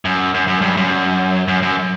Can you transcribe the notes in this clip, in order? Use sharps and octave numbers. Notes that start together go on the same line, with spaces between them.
F#2
F#2
F#2
G2
F#2
F#2
F#2